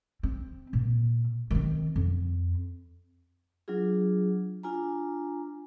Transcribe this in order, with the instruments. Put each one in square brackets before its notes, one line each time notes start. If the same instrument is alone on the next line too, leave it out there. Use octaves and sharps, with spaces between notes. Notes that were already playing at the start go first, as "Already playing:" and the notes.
[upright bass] C4
A#2
D#3 C4
F2
[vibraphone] F#3 D4 F4 G#4
D4 F4 G#5 A#5